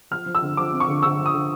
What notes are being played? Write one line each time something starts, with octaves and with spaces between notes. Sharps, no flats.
F3 F6
F3
E6
D3
F3 D6
C4
C#6
D3
D3 E6
F3
D#6
D3